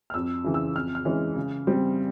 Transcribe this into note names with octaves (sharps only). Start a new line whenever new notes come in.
F6
F2 E6
C#3 E3
E6
F2 F6
F6
E3 G#3 C#4
C#3
G3 C4